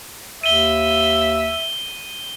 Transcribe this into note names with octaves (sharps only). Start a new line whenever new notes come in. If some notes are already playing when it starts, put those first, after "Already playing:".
D#2 E5 D#7 G7